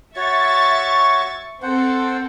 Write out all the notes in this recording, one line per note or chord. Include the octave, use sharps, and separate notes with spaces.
F#4 C#5 E5 C#6 A6
C4 A4 C5 F#5